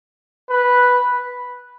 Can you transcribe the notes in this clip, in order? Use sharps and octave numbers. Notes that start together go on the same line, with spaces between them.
B4